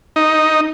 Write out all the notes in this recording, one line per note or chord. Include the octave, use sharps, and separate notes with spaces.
D#4